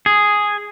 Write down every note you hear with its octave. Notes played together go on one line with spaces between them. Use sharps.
G#4